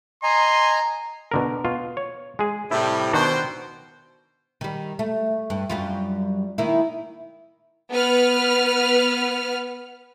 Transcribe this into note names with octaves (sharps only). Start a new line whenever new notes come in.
D#5 G#5 A#5 C6
B2 D3 A#4
B2 F4
C#5
G#3 G#4
A2 C3 G3 E4
B2 D#3 D4 F#4 C5 G5
D#3 G3
A3
G2
F#2 G3 F4
D#3 A#3 E4
B3 B4 F6